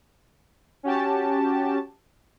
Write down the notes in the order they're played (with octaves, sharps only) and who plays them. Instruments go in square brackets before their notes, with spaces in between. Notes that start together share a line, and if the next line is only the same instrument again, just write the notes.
[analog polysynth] C#4 F#4 G4 A5